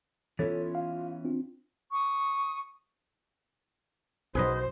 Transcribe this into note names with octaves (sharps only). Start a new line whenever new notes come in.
E3 B3 C#4 F4 A4 C#5 A6
F5
C4 D4 F4
C#6 D#6
B1 F#2 F#3 G#4 B4 C5 D#5